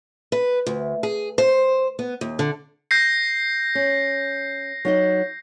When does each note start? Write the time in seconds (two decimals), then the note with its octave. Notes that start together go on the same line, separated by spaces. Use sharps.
0.32 B4
0.66 D2
1.03 G#4
1.38 C5
1.99 B3
2.21 D#2
2.39 D3
2.91 G6 A#6 C7
3.75 C#4
4.85 F#3 D#4 D#5